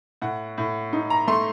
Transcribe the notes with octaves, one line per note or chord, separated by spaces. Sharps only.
A2 F#5
A2
D#4
A#5
A3 C6